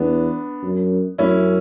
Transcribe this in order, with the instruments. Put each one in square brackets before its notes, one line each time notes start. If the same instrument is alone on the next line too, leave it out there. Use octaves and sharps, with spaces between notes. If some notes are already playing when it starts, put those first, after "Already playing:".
Already playing: [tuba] E2 [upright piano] B3 D4
[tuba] F#2
[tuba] F#2 [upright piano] C#4 E4